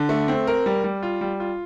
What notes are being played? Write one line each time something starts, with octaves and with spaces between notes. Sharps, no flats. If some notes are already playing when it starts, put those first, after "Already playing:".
Already playing: D3
A3
C4
A#4
G3
G3
F4
G3
F4